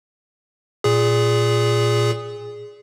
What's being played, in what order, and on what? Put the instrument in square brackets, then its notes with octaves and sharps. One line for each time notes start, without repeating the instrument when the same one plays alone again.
[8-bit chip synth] A#2 G#4